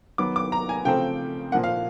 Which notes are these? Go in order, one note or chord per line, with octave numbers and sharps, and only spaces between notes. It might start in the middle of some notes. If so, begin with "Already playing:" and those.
D#3 F#3 B3 D6
D6
A#5
G#5
C#3 F3 A3 C4 G5
A#2 F3 A#3 F#5
F5